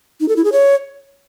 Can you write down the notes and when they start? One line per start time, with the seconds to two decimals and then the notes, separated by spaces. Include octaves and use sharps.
0.20 D#4
0.28 A4
0.36 E4
0.44 G#4
0.52 C#5